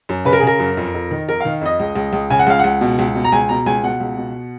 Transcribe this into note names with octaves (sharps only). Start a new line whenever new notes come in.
F#2
C#3 B4
A#4
G#4
C#3 A#4
F#2
F2
F2
D#3
F2 A#4
D#3 F5
F2 D#5
C#2
C#2
C#2
C#3 G#5
F#5
C#2 F5
F#5
C#2
B2
C#2
B2
A#5
C#2 G#5
B2 A#5
C#2 G#5
B2 F#5
C#2
B2